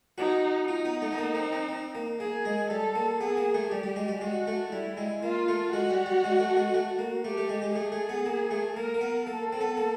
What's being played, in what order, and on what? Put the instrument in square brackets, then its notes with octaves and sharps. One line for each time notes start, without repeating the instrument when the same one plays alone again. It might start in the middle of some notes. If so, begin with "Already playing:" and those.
[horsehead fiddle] D#4 [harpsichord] F#4
[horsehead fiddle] D#4 [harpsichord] F4
[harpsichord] B3
A3
B3
A#3
C4
C4
C4
A#3
[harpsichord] A#3 [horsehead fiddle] G#4
[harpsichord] G#3
[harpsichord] G3 [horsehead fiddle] A4
[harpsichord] A#3
[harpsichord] B3 [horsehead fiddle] G#4
[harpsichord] A#3
A3
[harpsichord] G3 [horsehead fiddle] G4
[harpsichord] G3
G#3
G3
[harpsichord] G#3 [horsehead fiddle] F#4
[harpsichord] A3
[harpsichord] G3 [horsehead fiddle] E4
[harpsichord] G#3
[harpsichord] A#3 [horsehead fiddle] F4
[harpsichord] A3
[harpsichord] G#3 [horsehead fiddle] F#4
[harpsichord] G3
G3
G#3
A3
G#3
A3
A#3
[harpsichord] A3 [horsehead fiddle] G4
[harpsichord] A3
G#3
G#3
[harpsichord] A3 [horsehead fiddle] G#4
[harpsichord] A3
B3
A#3
A3
[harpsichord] A#3 [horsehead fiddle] A#4
[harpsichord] A#3
B3
[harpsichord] A#3 [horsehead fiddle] A4
[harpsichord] C4
B3
A#3